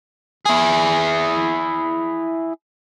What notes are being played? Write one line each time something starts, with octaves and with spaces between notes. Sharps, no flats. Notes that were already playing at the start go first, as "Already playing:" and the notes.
E4 G#4